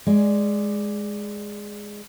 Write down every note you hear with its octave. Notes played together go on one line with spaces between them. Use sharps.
G#3 D5